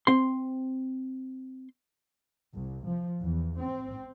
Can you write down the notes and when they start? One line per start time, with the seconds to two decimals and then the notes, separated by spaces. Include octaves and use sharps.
0.07 C4 C6
2.54 C2
2.87 F3
3.21 E2
3.59 C4